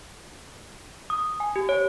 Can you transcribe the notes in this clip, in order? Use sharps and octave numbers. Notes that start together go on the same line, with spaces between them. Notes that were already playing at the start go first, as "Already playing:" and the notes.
D#6
G#5
G4
C#5